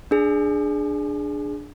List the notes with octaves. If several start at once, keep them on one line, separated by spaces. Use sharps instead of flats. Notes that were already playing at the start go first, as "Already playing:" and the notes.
D4 G#4